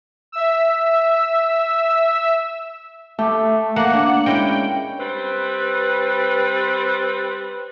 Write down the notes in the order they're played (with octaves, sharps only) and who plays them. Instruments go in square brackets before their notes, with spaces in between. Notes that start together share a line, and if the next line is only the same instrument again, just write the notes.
[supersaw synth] E5 E6
[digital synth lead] A3 [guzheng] G4
[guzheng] A3 A#3 [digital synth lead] F#5
[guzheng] D4
[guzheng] G#3 C#4 E4 [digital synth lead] G5
[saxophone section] G3 C4 B4